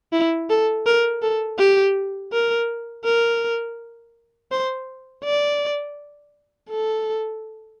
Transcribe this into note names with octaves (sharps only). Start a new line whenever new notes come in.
E4
A4
A#4
A4
G4
A#4
A#4
C5
D5
A4